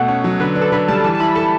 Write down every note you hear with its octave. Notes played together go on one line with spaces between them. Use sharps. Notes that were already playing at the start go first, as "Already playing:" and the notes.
Already playing: B2 A3 F#5
C#4
F#3
D3 B4
D4
A4
D3 B4
G3 A5
E3 A5
A5
E4 B5
A4 A5